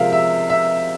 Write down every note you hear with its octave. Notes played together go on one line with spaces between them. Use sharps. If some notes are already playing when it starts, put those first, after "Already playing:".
Already playing: C3 F3 G#3 A#4 E5 F5
E5
E5